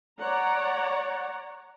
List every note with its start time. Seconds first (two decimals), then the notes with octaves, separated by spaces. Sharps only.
0.20 C#5 D5 F#5 A#5